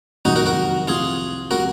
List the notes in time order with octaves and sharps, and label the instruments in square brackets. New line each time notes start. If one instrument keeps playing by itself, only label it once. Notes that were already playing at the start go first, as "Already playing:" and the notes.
[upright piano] F#1 F2 C3 D#3 G#3 [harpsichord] D#4 F#4
[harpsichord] F#4 A#4
F#4 A#4
[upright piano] C2 C3 F3 [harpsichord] F4 G#4
[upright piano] C3 F3 G#3 C#4 [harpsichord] F#4 A#4